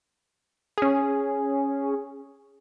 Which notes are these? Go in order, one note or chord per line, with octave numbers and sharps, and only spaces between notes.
C#4 G#4